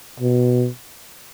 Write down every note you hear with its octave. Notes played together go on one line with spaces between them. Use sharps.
B2